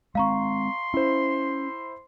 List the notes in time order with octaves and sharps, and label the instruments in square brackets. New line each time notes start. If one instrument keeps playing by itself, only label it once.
[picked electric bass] G#3 C4 [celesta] F5 A#5 C#6 [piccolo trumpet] C6
[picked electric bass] C#4 [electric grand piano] E4 C5